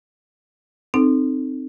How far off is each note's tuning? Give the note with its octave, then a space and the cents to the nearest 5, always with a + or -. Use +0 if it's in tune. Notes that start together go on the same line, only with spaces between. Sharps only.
C4 +0 D#4 -20 A4 +5